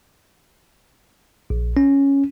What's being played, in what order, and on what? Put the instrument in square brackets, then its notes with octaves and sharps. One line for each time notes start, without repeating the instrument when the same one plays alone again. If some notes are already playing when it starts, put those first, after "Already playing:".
[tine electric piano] A#1
C#4